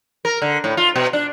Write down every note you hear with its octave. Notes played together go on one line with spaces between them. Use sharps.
A#4
D3
A2
F4
B2
D4